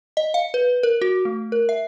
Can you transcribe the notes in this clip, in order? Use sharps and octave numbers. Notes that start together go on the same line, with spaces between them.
D#5
F5
B4
A#4
F#4
A3
A#4
E5